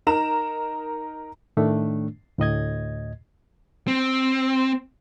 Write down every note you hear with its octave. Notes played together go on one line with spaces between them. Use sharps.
D#4 A#4 A#5 E7
A2 D#3 A3 D4
D2 A2 D#5 G#6
C4